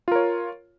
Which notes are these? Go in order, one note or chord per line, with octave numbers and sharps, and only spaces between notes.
F4 A#4 C#5